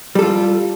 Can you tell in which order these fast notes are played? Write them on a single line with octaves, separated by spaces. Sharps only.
G3 A4 F4